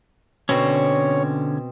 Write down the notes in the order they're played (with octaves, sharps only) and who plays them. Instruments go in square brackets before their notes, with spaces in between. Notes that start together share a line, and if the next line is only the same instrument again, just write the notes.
[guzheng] B2 C4 [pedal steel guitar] D3 C#4 [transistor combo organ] C#5